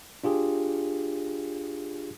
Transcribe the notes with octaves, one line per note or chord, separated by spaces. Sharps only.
D4 F4 G4 G#4